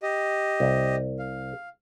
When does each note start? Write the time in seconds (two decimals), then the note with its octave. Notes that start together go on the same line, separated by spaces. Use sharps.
0.03 G4 D#5
0.60 C2
1.19 F5